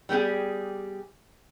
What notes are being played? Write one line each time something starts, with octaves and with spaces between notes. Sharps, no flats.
G3 B3 G4 G#4